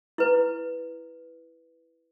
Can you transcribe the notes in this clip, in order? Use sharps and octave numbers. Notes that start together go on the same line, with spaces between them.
E4 B4